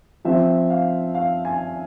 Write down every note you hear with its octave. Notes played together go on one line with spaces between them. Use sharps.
F3 C4 E5
F5
F5
G#5